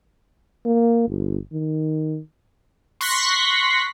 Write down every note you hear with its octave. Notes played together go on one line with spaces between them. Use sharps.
A#3
G1
D#3
C6 C#6 F#6 A#6 B6